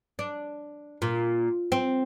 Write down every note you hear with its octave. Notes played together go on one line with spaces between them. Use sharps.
D4
A#2
C4